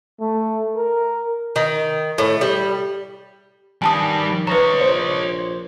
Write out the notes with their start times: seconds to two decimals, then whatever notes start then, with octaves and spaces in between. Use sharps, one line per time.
0.20 A3
0.77 A#4
1.56 D#3
2.18 A2
2.41 G3
3.82 D#3 G3 D4 G#5 A5 D#6
4.47 B4 C#5 D#5 A#5
4.80 A#1 C5